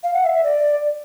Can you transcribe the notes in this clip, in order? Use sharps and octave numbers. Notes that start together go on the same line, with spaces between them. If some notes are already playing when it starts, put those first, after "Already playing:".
F5
F#5
E5
E5
D5